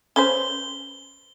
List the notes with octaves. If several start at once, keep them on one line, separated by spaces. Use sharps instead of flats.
C#4 B4 C5 G7